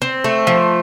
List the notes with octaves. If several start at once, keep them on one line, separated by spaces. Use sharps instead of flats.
C4
A3
F3